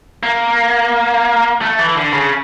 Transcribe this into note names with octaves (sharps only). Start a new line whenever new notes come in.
A#3
A3
E3
D3
C#3